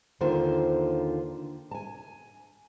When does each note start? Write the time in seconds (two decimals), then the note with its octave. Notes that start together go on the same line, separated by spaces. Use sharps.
0.21 D#2 D3 D#3 F4 C5
1.71 G#5 A5